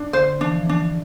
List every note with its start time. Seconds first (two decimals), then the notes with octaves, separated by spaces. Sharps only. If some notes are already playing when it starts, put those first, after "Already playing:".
Already playing: D4
0.13 D3 C5
0.41 E3 D4
0.52 F3
0.63 E3
0.69 D4